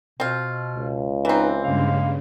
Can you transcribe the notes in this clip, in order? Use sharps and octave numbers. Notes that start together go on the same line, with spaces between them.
B2 C4 F4
C#2
E3 C4 D#4 B4
G2 C#3 G#3 A#3 F5